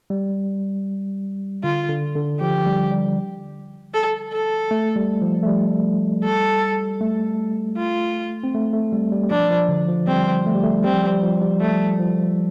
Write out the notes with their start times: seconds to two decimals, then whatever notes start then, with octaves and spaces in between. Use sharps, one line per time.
0.10 G3
1.64 D3 F4
1.89 D3
2.15 D3
2.40 F3 G4
2.67 G3
2.91 G3
3.94 A4
4.32 A4
4.71 A3
4.96 G3
5.22 F3
5.43 A3
5.47 G3
6.24 A4
7.01 A3
7.77 F4
8.44 C4
8.54 A3
8.73 A3
8.93 G3
9.12 G3
9.24 G3
9.31 F3 D4
9.50 F3
9.69 D3
9.88 F3
10.07 G3 C4
10.46 A3
10.55 G3
10.63 A3
10.84 G3 C4
10.94 F3
11.04 G3
11.23 F3
11.42 G3
11.60 G3 A3
11.99 F3